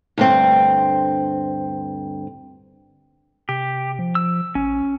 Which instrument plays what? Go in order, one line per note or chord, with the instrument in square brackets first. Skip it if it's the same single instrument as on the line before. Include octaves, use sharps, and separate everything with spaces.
[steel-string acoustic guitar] D2 G2 C4
[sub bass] C3 [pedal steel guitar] G4
[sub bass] F3
[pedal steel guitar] E6
[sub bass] A1 [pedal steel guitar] C#4